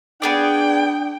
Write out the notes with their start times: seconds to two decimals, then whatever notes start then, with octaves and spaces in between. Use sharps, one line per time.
0.22 B3 D4 G#4 D5 G5